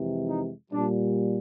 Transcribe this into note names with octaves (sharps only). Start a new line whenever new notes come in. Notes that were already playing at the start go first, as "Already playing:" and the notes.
Already playing: F2 C3 E3 G#3
D#4
A#2 G3 D4